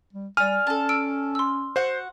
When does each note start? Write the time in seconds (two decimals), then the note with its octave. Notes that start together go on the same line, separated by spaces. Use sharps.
0.13 G3
0.37 G3 D5 G#5 F6
0.67 C#4 A4 A5
0.89 E6 D7
1.35 C6 E6
1.76 F#4 C5 F#5